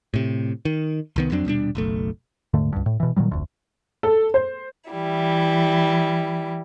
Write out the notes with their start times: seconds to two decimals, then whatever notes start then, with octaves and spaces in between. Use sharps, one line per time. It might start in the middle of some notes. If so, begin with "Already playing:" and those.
0.14 A2 C3
0.65 D#3
1.16 C2 D#3 B3
1.31 F2 F#3 C4 D4
1.45 D#1 B2 G3 D4
1.75 F#1 B1 A3
2.54 D#1 G#2 D3 A3
2.72 C#2 G2
2.86 A2
3.00 B2 E3
3.16 A#2 D#3 F#3 G3
3.31 F1 D2
4.03 A4
4.34 C5
4.91 E3 G3 E4